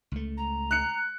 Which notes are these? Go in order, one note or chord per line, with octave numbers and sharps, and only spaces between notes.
C#2 A3
A#5
F#6 C#7